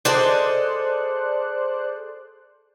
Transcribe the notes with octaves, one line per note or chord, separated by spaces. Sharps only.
G#4 A4 C5 D5 D#5 F#6